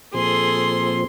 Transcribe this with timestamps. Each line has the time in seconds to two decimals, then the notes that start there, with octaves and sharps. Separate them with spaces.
0.14 A#2 F3 C4 G#4 A4 C6